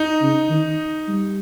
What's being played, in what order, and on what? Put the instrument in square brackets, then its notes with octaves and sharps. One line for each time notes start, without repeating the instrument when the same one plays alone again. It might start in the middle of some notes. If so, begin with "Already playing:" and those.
Already playing: [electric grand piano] D#4
[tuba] C#3
D#3
G3